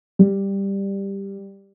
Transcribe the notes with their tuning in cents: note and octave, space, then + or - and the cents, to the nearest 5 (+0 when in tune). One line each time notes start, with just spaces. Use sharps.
G3 +5